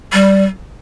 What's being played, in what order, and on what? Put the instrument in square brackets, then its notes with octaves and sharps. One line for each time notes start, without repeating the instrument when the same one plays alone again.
[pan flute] G3